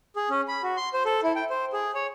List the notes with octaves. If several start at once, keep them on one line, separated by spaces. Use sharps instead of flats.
G#4
C#4
B5
F#4
C6
C5
A4
E4
G5
C5
G#4
C#5